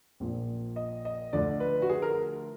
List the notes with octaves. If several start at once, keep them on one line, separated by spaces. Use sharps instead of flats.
A#1 A#2 F3
D#5
D#5
D2 D3 F3 D5
B4
F#4
G#4
A#4